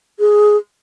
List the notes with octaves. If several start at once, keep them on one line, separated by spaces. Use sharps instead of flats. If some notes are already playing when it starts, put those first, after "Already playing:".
G#4